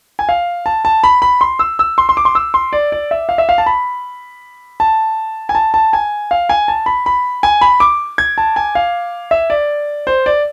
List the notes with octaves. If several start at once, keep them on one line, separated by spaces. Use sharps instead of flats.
G#5
F5
A5
A5
B5
B5
C6
E6
E6
C6
C6
D6
C6
E6
C6
D5
D5
E5
F5
E5
F5
A5
B5
A5
G#5
A5
A5
G#5
F5
G#5
A5
B5
B5
G#5
B5
D6
G#6
A5
G#5
F5
E5
D5
C5
D5